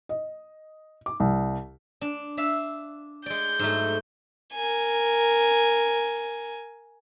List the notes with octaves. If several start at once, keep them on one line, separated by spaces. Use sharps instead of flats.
D#5
D6
C2
D4
D4 E5 F5
G#3 D5 G6
G#2 F#3 A3
A#4 G#5